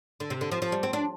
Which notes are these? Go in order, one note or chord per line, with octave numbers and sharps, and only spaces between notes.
D3
C3
D3
F3
F3
G3
C4
D4